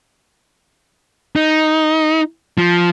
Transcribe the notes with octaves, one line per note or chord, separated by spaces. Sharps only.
D#4
F3